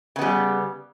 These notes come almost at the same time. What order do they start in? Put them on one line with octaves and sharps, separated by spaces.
C#3 B3 G3